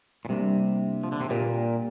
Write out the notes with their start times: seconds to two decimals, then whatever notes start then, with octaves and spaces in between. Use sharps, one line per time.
0.25 A#2
0.29 C3 G3 A#3 D4
1.04 F3
1.12 D3
1.21 C3
1.29 A#2 A#3 G4 A#4